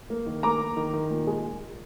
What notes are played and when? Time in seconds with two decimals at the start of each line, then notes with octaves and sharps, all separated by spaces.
0.10 A#3
0.26 D#3
0.43 A#3 A#5 D6
0.60 A#3
0.77 D#3
0.93 D#3
1.11 A#2
1.27 G#3